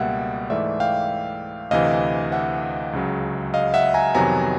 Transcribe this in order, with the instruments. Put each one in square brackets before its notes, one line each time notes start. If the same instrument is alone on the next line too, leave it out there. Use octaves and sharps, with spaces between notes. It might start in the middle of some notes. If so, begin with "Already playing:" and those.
Already playing: [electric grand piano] C#2 B2 G3 A#3 E5 F#5
G#2 E3 A3 D5 E5
F5 G5
D2 C3 E3 D#5 F5
E5 F#5
C#2 C#3 F#3
D#5 F5
E5 F#5
G#5 A#5
F2 C3 D#3 F#3 B3 G#5 A#5